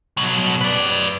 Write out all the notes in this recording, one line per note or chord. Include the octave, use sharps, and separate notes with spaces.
B2 F#3
B4 D5